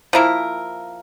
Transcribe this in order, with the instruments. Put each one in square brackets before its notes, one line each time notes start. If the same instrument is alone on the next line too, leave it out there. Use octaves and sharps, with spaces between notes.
[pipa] F3 A#3 E4 A#4